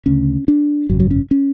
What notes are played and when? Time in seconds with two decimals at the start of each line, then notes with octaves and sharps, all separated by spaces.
0.06 D2 C#3 C#4
0.48 D4
0.90 G#1 F#2 C#3 F#3
1.00 F#3
1.11 C#4
1.31 C#4